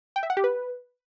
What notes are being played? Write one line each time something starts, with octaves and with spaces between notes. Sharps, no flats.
G5
E5
F#5
G4
B4